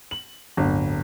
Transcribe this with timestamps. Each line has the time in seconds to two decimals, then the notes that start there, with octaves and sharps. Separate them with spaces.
0.11 F#7
0.57 D1 G1